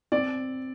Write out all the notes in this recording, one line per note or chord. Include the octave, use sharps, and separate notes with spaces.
C4 D5